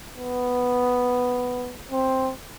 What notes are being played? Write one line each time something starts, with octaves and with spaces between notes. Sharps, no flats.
B3
C4